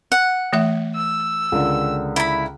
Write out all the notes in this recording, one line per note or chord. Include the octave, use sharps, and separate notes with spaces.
F#5
E3 A3 E5
E6
C#2 D3 A#4
E4 B5